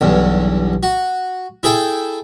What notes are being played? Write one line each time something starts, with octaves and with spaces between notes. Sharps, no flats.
B1 E2 G2
F#4
E4 G#4 A4 G5